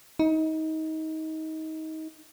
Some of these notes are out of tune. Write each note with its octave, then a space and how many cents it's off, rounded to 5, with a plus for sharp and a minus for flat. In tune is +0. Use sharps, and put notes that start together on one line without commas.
D#4 +25